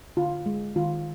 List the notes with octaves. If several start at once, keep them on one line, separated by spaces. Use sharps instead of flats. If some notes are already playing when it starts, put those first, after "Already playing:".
D3 F4
G#3
D#3 F4